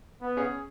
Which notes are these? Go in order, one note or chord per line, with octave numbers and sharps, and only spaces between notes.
B3
C#4 G#4 C#5